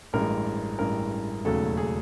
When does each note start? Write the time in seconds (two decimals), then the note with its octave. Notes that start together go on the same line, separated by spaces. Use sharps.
0.13 A1 G2 E3 G#3 A#4
0.79 A1 G2 E3 G#3 A#4
1.45 E1 D#2 C#3 F#3 A3 A4
1.77 G#4